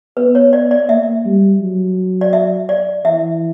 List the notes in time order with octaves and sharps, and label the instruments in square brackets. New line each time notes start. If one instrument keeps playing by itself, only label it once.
[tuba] B3 [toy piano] B4
[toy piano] C#5
D5
D5
[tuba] A#3 [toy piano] E5
[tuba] G3
F#3
[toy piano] D5
E5
D5
[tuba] E3 [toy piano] E5